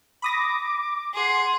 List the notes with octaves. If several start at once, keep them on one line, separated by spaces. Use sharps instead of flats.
B5 D6 D#6 A#6
G#4 F#5 C6 C7